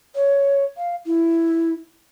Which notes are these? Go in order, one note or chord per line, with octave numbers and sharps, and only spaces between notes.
C#5
F5
E4